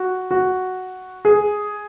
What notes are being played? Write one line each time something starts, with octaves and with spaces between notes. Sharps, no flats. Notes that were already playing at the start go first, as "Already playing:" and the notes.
Already playing: F#4
F#4
G#4